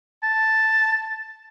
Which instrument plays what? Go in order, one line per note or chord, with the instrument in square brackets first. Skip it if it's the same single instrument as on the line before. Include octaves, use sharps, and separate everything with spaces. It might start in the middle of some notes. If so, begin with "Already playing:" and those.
[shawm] A5